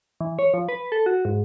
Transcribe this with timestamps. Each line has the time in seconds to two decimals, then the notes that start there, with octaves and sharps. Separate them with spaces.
0.21 E3
0.39 C#5
0.54 F3
0.69 B4
0.92 A4
1.06 F#4
1.25 G#2